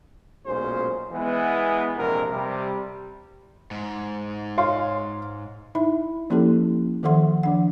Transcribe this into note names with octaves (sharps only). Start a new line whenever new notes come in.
B1 A#2 G#3 C#4 C5
E3 G#3 B3
A#1 F2 C3 G#3 A#4
C3 G3
G#2
C#5 F5 C6
D#4 E4 E5 B5
F3 A#3 C#4 E4 G4 A4
D#3 F3 A4 E5 F#5 C6
F3 D4 F#5